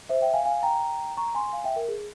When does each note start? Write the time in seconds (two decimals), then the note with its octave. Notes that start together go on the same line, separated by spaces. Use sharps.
0.09 C5 E5
0.22 E5 G5
0.34 F5 G#5
0.45 F5 G#5
0.63 G5 A#5
1.17 A#5 C#6
1.35 G#5 C6
1.53 F5 G#5
1.64 E5 G5
1.76 A#4
1.88 G#4